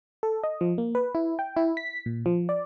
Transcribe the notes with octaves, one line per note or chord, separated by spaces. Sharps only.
A4
D#5
F3
A#3
B4
E4
G5
E4
B6
A#2
F3
D5